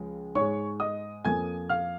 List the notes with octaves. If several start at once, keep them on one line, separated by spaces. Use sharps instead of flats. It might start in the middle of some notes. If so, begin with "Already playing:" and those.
Already playing: C#2 C#3 F3 G#3
G#2 G#3 C#5 C#6
D#5 D#6
F2 F3 A#3 G#5 G#6
F5 F6